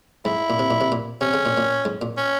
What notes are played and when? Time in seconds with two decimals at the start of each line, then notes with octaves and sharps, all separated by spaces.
0.25 G#2 E4
0.50 A#2
0.59 C3
0.71 A#2
0.81 C3
0.92 A#2
1.21 C3 C#4
1.34 C#3
1.46 A#2
1.57 A#2
1.85 G#2
2.01 A#2
2.17 C#4